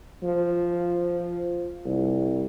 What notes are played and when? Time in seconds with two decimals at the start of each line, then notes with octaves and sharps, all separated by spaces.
0.22 F3
1.85 C2